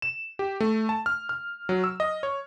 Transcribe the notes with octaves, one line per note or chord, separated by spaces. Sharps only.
E7
G4
A3
A5
F6
F6
F#3
E6
D#5
C#5